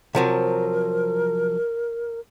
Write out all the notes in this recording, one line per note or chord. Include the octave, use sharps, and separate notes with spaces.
C3 F3 F#3 A#4